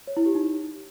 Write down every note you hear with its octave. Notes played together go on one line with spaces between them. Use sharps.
C#5
E4
G4
D#4